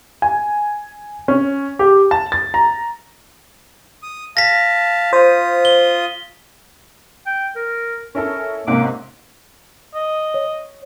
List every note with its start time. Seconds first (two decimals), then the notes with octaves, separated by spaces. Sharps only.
0.22 G#5
1.28 C#4
1.79 G4
2.11 A5
2.32 A6
2.54 A#5
4.03 D#6
4.37 F5 A5 A#6 B6
5.13 F4 C5 D#6
5.65 G7
7.26 G5
7.56 A#4
8.15 C#4 E4 A4 A#4
8.67 G#2 C3 A#3 C#4 D6
9.95 D#5
10.34 C#5